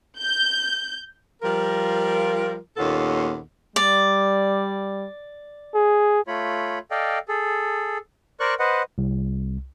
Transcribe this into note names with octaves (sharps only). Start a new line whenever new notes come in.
G6
F3 G3 F4 A#4
D#2 A#2 B3 C#4 F4 A4
G3 D5
G#4
A3 F4 C#5 B5
A4 D5 D#5 F5 G5
G#4 A4
A#4 C5 D5 C#6 F#6
B4 C5 D#5 F#5
C2